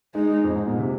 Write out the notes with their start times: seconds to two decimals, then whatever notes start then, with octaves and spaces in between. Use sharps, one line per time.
0.15 G#3 D#4
0.44 F2
0.56 G#2
0.67 A#2
0.78 C3